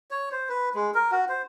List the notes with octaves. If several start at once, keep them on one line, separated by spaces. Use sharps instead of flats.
C#5
C5
B4
G#3
A#4
F#4
C5